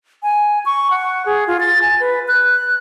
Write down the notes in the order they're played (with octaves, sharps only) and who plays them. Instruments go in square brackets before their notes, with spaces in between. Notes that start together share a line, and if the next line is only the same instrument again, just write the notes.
[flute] G#5
C#6
F#5
G#4
F4
A6
G#5
B4
F#6